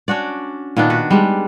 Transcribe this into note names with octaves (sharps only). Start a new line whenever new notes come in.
C#4 D4 F#4 D5
A#2 D#3 B3 D4
F#4 B4
G3 G#3 D4